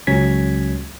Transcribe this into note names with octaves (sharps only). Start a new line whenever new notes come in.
C#2 F#3 C#4 G#6 B6